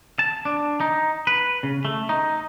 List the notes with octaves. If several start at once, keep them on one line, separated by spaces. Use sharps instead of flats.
A5
D4
D#4
B4
C#3
A3
D#4